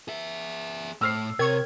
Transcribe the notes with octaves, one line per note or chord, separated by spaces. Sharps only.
G#4 E5
A2 E6 F6 C7
C3 A#4 C#5 G#6